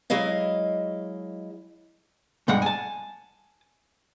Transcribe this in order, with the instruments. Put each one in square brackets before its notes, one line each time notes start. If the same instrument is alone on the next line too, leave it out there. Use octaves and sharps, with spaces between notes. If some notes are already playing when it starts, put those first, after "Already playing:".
[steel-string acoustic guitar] F#3 G#3 E4 D#5 F5
[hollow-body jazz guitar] B1 G2 G3 G#3 F#5
G#5 A5